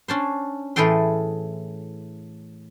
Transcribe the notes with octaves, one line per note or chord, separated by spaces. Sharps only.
C#4 D4 C5
A2 E3 G#4 A4 G5 C6